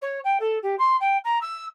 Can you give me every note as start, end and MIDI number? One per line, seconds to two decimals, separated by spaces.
0.01 0.19 73
0.24 0.37 79
0.40 0.58 69
0.62 0.75 67
0.78 0.96 84
1.00 1.17 79
1.24 1.38 82
1.41 1.65 88